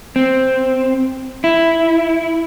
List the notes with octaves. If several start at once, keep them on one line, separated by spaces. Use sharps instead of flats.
C4
E4